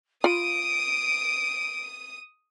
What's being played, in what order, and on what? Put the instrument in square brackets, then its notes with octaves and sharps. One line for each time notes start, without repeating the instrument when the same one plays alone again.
[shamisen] F4 B5 [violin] D#6 D#7 [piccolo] D7